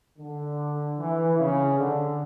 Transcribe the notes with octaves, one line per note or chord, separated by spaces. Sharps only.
D3
E3
C#3
D3